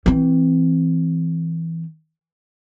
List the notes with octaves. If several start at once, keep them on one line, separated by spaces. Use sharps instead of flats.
E3 C4